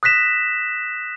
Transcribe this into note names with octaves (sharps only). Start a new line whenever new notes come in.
D#6 F#6 A#6 B6 E7